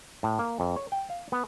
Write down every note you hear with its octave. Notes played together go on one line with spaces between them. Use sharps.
A2
A#3
F2
C#5
G5
F5
B3